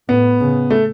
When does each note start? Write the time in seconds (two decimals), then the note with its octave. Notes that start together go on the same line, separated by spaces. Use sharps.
0.09 A2 B3
0.40 C#3
0.70 A3